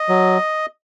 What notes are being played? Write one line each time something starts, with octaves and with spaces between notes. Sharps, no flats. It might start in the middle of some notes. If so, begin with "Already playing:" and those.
Already playing: D#5
F#3